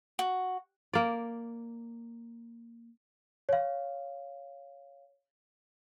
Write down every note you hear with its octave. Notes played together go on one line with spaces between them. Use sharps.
F#4
A#3 D5
C#5 F5